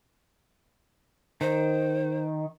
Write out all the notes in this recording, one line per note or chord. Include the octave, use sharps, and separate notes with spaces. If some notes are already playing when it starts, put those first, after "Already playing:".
D#3 C5